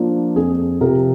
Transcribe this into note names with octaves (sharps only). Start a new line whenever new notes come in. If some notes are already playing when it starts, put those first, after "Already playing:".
Already playing: F3 A#3 D4
F2 G#4
C3 F3 A#4